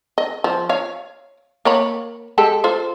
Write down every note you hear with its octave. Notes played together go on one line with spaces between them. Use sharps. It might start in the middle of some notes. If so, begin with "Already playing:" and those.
D#5
F3
C#5 F5
A#3 C#5 B5
G#3 G4 A4
F4 A4 C5